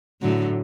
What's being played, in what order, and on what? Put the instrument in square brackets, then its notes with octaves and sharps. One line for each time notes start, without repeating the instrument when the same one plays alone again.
[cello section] A2 [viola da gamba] D3 F#3